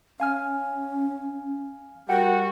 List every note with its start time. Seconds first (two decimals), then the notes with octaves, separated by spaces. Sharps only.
0.20 C#4 F5 G#5 F6
2.09 G3 F#4 A#4 F#5 G5